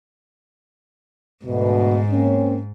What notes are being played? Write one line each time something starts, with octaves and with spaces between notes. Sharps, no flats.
D2 G#2 B2
A#3 C4 C#4